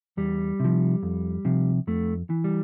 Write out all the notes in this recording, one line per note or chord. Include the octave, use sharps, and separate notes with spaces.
E2 G3
C3 F3
F2
C3 F3
F2 A3
E3
G3